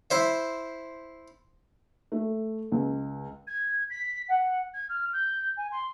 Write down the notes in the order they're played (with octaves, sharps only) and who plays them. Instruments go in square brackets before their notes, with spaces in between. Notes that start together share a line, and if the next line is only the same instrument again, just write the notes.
[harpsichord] E4 C5 E5
[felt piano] A3
C#2
[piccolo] G#6
B6
F#5
G#6
F6
G6
G#5
C6